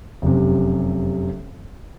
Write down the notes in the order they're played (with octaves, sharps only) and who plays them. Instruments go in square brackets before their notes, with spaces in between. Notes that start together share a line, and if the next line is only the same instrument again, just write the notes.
[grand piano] F1 F#2 C3